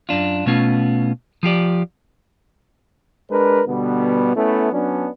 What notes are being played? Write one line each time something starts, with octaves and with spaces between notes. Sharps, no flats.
F#2 D4 F4
B2 A3 B3 C#4 F4
F3 F4 G4 D5
G#3 D4 A#4 B4
B2 D3 G3 B3
A3 B3 C#4 E4 A4
F#3 B3 C#4 D4